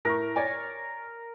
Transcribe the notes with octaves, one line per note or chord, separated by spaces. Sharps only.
A2 A#4 C#6
C#5 D5 G#5